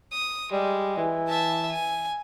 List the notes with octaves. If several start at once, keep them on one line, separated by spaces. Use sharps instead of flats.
D#6
G3 G#3
E3
E5 A5
G#5